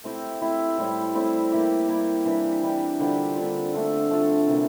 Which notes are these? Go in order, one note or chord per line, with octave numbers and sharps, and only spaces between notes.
A3 C4 E4 G4
A3 C4 E4 G4
A2 G3 C4 E4
A2 G3 C4 E4
G3 A#3 E4 G4
G3 A#3 E4 G4
E3 G3 D4 G4
E3 G3 D4 G4
D3 G3 C4 F4
D3 G3 C4 F4
A3 D4 F4 A4
A3 D4 F4 A4
C3 E3 A#3